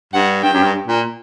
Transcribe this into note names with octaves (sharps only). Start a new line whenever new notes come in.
G2 F#5
G2 G5
F#2
G2
A#2